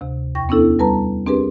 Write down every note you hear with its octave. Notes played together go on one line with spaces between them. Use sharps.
D2 C3
E2 G5 C#6 A#6
B3 C#4 D4 E4 A4
G3 B4 A5 A#5
C4 D4 G4 G#4 A#4 B4